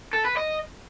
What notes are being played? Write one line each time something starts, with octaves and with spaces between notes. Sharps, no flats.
A4
B4
D#5